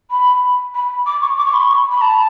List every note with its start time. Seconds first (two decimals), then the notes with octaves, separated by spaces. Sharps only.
0.11 B5
0.74 B5
1.06 D6
1.22 C#6
1.38 D6
1.46 C#6
1.53 B5
1.61 C#6
1.91 B5
2.02 A5